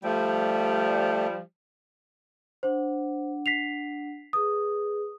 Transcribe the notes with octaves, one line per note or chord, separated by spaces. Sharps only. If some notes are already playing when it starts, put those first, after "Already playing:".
F3 G3 A3
D4 C5 F#5
B6 C7 F7
G#4 B4 D#6